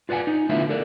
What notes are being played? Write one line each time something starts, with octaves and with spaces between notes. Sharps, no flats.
F4 B4 D5 F#5 G#5
D#4
D3 A3 B3 E4 F4
A4 A#4 D5